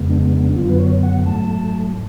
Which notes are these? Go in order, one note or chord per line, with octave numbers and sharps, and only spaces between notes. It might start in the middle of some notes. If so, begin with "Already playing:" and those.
Already playing: F2 C#3 G#3 B3
D4
D4
F#2 D3 F#3 B3 F4
B4
C#5
F#5
G#2 F#3 A3 A5